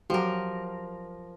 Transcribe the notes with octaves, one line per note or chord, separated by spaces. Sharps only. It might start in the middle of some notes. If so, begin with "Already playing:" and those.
F3 F#3 F#4 G4 A#4